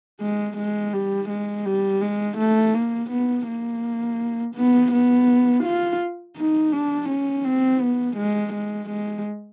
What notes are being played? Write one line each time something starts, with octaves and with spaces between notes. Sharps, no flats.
G#3
G#3
G3
G#3
G3
G#3
A3
A#3
B3
A#3
B3
B3
F4
D#4
D4
C#4
C4
B3
G#3
G#3
G#3